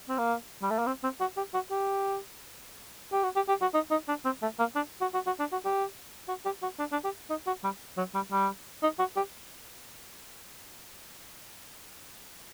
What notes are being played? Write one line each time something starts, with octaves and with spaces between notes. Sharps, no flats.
C4
A#3
G3
A3
A#3
C4
C4
F#4
G4
F#4
G4
G4
F#4
G4
G4
F#4
D#4
D#4
D4
C4
A3
A#3
D4
F#4
F#4
F#4
D4
F#4
G4
F#4
G4
F#4
D4
D4
G4
D#4
F#4
G3
F#3
G3
G3
D#4
F#4
G4